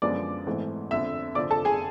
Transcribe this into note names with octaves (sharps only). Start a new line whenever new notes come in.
F#2 D3 F3 G#3 B3 D5 D6
G#1 G#2 E3 A3
G1 F2 D3 E5 E6
F1 F2 D3 F3 D5 D6
A4 A5
G#4 G#5